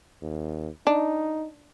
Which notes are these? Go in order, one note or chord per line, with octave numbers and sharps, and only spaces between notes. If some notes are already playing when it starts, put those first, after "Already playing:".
D#2
D4 D#4